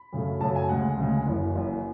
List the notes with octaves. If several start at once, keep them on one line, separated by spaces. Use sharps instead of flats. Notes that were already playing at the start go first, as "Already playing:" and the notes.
Already playing: B5
F#2 C#3 F#3 A3
F#2 C#3 F#3 A3 A5
G#5
D2 C#3 G#3 F#5
D2 C#3 G#3
F#1 F#2 E3
F#1 F#2 E3